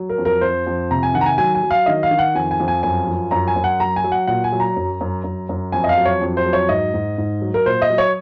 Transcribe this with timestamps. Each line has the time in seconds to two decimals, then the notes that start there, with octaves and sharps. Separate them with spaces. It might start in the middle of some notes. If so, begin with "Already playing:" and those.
Already playing: F#3
0.10 A#4
0.18 F2
0.25 A#4
0.41 F2 C5
0.67 F2
0.91 C3 A#5
1.03 G#5
1.14 D#3 F#5
1.21 A#5
1.26 G#5
1.38 F#3 G#5
1.55 G#5
1.63 F#3
1.71 F5
1.86 D#3 D#5
2.03 F5
2.11 D#3
2.19 F#5
2.35 F2 G#5
2.51 G#5
2.60 F2
2.68 G#5
2.83 F#2 G#5
3.07 F3
3.31 F#2 A#5
3.48 G#5
3.56 F#2
3.64 F#5
3.80 F#3 A#5
3.96 G#5
4.04 F#3
4.12 F#5
4.27 A#2 F#5
4.44 G#5
4.52 F#3
4.60 A#5
4.76 F#2
5.01 F#2
5.24 F#2
5.49 F#2
5.72 F2 G#5
5.84 D#5
5.89 F5
5.98 F#3
6.05 C#5
6.21 F2
6.37 C5
6.46 F#3
6.53 C#5
6.69 G#2 D#5
6.94 G#2
7.18 G#2
7.42 F#3
7.54 A#4
7.66 A#2 C5
7.82 D#5
7.90 F#3
7.98 C#5